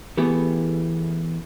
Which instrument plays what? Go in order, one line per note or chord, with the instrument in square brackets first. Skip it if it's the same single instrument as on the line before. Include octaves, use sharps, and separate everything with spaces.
[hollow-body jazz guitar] E3 A3 B3 G4 G#4